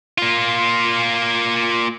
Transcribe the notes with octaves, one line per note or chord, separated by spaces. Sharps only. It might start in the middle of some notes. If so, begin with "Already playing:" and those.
A#3 F4